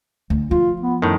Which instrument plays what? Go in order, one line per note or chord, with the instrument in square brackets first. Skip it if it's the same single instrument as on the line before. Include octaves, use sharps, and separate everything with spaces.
[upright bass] D2
[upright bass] F3 [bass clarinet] F4
[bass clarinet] B3
[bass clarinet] F#2 [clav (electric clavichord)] A2 D#3